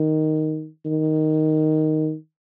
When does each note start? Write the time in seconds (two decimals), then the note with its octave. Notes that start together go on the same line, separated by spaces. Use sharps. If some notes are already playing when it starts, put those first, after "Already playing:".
Already playing: D#3
0.85 D#3